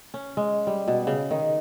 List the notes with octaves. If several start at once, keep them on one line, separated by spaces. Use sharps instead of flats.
C#4
G#3
G3
B2
C#3
D#3